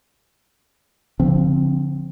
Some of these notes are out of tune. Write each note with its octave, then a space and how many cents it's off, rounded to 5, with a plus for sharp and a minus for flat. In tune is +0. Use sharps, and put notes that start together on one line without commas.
D3 -35 F3 +0 C4 +0